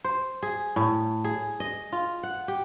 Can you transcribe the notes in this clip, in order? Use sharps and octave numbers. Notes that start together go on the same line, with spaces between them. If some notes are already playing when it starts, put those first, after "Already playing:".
C5
G#4
A2
G#4
D#5
F4
F#5
G4